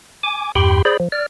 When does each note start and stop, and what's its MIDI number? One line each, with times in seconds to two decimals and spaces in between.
0.23 0.52 80
0.23 0.52 86
0.55 0.82 40
0.55 0.82 43
0.55 0.82 67
0.55 0.82 79
0.55 0.82 83
0.55 0.82 84
0.85 0.97 68
0.85 0.97 72
0.85 0.97 74
0.85 0.97 83
1.00 1.08 53
1.12 1.26 74
1.12 1.26 89